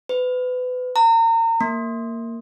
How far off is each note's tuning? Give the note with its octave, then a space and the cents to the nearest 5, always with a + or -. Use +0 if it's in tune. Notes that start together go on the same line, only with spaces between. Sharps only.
B4 +30
A#5 -35
A#3 -15